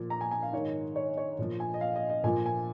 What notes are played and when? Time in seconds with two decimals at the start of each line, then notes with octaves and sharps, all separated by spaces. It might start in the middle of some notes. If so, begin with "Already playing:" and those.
Already playing: A#2 F3
0.10 A#5
0.21 G#5
0.31 G#5
0.43 F5
0.53 G#2 D#3 C#5
0.96 C#5
1.18 C#5
1.39 A#2 F3
1.60 G#5
1.74 D#5
1.81 F5
1.96 D#5
2.10 D#5
2.24 A#2 F3 G#5
2.46 G#5